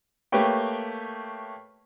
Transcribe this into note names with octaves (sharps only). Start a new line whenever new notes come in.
A3 A#3 G4 B4 C#5 G5